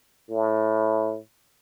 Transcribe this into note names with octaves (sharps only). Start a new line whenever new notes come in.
A2